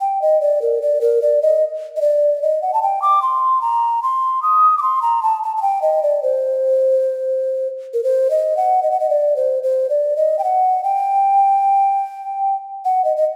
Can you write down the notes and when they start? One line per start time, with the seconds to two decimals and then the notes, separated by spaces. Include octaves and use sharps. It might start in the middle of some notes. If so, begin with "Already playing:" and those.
0.01 G5
0.22 D#5
0.41 D5
0.62 A#4
0.82 D5
1.01 A#4
1.22 D5
1.42 D#5
1.96 D#5
2.01 D5
2.42 D#5
2.62 F#5
2.74 A5
2.82 G5
3.02 D6
3.22 C6
3.61 A#5
4.03 C6
4.43 D#6
4.78 D6
4.82 C6
5.02 A#5
5.23 A5
5.43 A5
5.57 A5
5.62 G5
5.82 D#5
6.03 D5
6.23 C5
7.94 A#4
8.04 C5
8.30 D#5
8.57 F#5
8.83 D#5
8.91 F#5
9.00 D#5
9.10 D5
9.36 C5
9.63 C5
9.90 D5
10.16 D#5
10.39 G5
10.44 F#5
10.84 G5
12.85 F#5
13.04 D#5
13.17 D#5